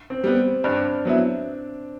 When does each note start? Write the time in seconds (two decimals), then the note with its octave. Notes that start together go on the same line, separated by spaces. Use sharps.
0.10 C4
0.24 G3 B3
0.64 G2 D4
1.05 F#3 B3 E4